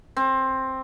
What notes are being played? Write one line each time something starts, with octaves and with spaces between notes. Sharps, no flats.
C4